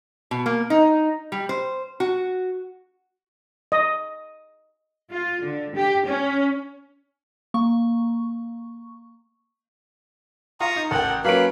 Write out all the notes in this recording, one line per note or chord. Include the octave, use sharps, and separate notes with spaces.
B2
A#3
D#4
G3
C5
F#4
D#5
F4
D3
G4
C#4
A#3 C#6
F4 A#5 C#6 D#6
D#4
A1 A4 A#4 F#5 G5
F#3 A#3 C#4 B4 F5 B5 D7